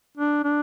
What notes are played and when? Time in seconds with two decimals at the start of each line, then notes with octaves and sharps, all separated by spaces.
0.17 D4
0.44 D4